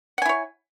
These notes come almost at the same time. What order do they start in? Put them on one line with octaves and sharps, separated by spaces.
F#5 G#5 E4 C#5